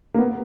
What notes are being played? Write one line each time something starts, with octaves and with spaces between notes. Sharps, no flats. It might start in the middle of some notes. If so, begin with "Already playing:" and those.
A#3
B3